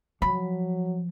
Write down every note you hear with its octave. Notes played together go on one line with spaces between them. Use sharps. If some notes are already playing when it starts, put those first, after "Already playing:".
F3 F#3 B5